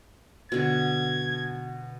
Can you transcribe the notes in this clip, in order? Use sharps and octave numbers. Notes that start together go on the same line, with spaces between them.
B2 D3 G#6